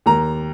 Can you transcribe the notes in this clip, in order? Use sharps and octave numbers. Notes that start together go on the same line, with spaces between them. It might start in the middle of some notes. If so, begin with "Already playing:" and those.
D#2 A#5